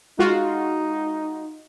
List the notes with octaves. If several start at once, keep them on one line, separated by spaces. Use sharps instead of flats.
G#3 D#4 F4 F#4